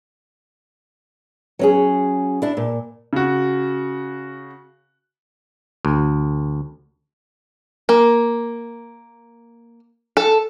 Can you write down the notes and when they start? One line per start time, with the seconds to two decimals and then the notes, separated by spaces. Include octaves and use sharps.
1.59 F#3 C#4 G#4
2.42 D4 E4
2.57 A#2
3.13 C#3 F#4
5.85 D2
7.89 A#3
10.17 A4